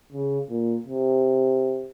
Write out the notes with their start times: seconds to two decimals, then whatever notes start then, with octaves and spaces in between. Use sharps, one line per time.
0.12 C#3
0.49 A#2
0.86 C3